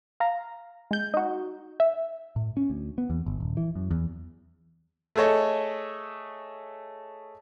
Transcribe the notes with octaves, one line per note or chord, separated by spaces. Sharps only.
F5 A#5
G#3 G6
D#4 F#4
E5
A2
C#4
D2
B3
E2
G1
D#1
E3
F#2
E2
A3 G#4 A4 C#5 D#5